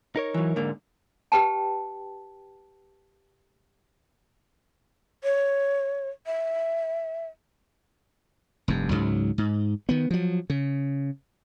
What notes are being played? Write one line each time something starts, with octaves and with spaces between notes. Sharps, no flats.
D#4 A#4 C#5
E3 F#3
G#2 D3 A#3
G4 B4 G5 A5
C#5
E5
F1 G2
C#2 G#2 F#3
G#2
D#3 B3
F3 F#3
C#3